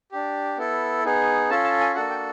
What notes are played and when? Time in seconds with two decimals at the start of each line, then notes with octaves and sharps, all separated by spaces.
0.12 D4 G4
0.57 B3 E4 A4
1.04 B3 D#4 G#4
1.50 C#4 F4 A4 A5
1.64 A5
1.80 G#5
1.95 A#3 D4 F#4 A4 F#5
2.10 G5